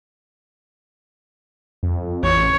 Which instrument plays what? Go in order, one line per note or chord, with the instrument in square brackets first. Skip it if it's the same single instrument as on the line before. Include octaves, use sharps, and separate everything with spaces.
[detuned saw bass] F2
[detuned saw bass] A1 [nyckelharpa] C#5